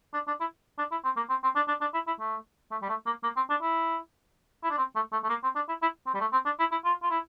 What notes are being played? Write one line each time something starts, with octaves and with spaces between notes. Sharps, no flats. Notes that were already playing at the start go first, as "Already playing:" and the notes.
D4
D4
E4
D4
E4
C4
A#3
C4
C4
D4
D4
D4
E4
E4
A3
A3
G3
A3
A#3
A#3
C4
D4
E4
E4
D4
C4
A3
A3
A3
A#3
C4
D4
E4
E4
C4
G3
A3
C4
D4
E4
E4
F4
F4
E4